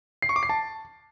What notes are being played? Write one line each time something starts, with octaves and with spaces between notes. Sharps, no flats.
C7
C#6
D6
C7
A5